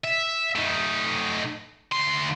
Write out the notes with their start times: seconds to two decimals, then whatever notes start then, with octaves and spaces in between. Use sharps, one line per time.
0.04 E5
0.56 A3 D#4
1.92 D2 C6